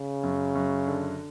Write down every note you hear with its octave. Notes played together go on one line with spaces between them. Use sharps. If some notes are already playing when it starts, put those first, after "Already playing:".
Already playing: C#3
F#2
F#2
D3